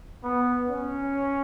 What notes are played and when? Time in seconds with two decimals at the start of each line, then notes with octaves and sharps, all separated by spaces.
0.24 B3
0.68 C#4